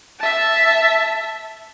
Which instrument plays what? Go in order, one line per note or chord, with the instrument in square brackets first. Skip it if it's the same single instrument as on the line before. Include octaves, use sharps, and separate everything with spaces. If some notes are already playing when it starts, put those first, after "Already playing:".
[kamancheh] E5 A5